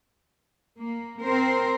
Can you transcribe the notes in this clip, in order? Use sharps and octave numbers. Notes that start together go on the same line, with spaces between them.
A#3
C4 A#4 C5